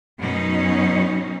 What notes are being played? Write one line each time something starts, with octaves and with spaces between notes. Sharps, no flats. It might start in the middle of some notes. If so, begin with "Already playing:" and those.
F#2 B2 C#4 D#4